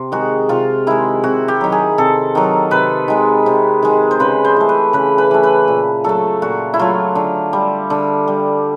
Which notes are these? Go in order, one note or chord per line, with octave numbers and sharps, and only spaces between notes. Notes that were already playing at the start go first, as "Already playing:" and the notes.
Already playing: C3
D#3 G#3 F#4
C3 F4
D#3 G#3 E4
C3 F#4
G4
D#3 F#3
G#4
C3 A4
D#3 F#3
C3 B4
D#3 G#3
C3
D#3 G#3
C5
C#3 B4
C5
E3 A3
B4
C#3 B4
B4
E3 A3
B4
A#2
F#3 A3 A4
A#2 F#4
E4
F#3 A3 F4
D3
G3
D3
G3